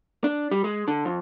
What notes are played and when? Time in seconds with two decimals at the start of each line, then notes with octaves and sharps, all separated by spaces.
0.24 D4
0.51 G3
0.64 G#3
0.88 D3
1.05 F2